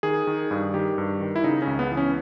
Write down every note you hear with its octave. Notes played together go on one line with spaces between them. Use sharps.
D#3 G#4
D#3
G2
D#3 G4
G2
D#3
E4
C#3 D#4
C#4
C#2
B3
E3
C#4